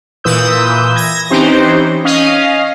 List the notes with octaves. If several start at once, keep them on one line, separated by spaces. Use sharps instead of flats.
A#2 E3 B4 D#6 E6 G6
G#6 A#6
E3 C4 C#4 D#4 G4 C5
C#4 D#5 F5